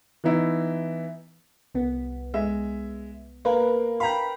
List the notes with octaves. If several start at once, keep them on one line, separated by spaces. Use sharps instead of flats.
E3 B3 D#4 E4
C2 B3
G#3 E5
A#3 A#4 B4
F5 G5 A#5 B5